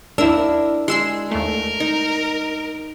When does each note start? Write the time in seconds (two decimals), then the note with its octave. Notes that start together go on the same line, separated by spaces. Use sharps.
0.18 D#2 D4 E4 A#4 E6
0.88 G#3 G#4 C6 E6 C7
1.31 D#2 A3 A#4
1.80 D#4